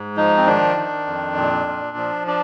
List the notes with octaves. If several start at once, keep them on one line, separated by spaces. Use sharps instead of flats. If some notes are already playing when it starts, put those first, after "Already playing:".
Already playing: G#2
F3 D#4
C4
D#3 D4
D#3
F2
A#2
A#2
F3
D4